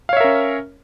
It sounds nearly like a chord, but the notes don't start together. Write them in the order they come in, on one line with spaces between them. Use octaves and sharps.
F5 C#5 E5 A#4 C#4